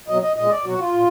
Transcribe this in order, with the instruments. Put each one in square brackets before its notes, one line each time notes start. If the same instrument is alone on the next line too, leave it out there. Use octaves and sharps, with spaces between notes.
[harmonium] B2 F#3 D#5
D#5
A#2 G#3 D#5
D5
B2 F#3 F#4
F4
A#2